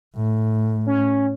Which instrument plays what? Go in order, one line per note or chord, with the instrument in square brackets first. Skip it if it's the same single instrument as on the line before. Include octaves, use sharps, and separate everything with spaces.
[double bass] A2
[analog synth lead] C#4